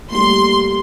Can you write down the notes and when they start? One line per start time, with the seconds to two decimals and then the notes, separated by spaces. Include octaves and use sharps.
0.10 G3 A3 A#3 C6